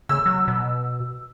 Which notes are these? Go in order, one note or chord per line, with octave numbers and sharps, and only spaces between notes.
C#3 E6
F#3
B2